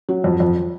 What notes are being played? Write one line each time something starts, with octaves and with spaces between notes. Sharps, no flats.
F#3
F2
F2